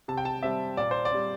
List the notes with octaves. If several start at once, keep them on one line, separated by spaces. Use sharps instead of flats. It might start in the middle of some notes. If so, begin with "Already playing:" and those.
C3 A5
G5
A5
G3 C4 E5
A#2 D5
C5
D5
G3 C4